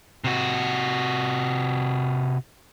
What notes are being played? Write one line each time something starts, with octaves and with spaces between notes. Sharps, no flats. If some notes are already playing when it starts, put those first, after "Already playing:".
C3 F#4